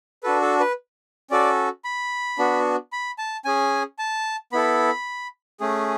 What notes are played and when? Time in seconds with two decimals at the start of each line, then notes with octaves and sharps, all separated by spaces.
0.23 D4 F#4 A4 B4
0.42 A4
0.60 B4
1.31 C#4 F#4 A4 D5
1.85 B5
2.39 B3 D4 F#4
2.92 B5
3.18 A5
3.45 C#4 G#4 G#5
3.99 A5
4.52 B3 E4 A4 B5
5.60 A3 C#4 G#4